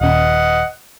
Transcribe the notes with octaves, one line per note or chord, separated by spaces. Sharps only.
D#1 C#4 D#5 F#5